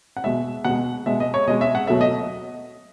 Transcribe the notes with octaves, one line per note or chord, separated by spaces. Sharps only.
F#5
B2 G#3 E5
B2 G#3 F#5
B2 G#3 E5
D#5
C#5
B2 G#3 D#5
E5
F#5
B2 F#3 A3 E5
D#5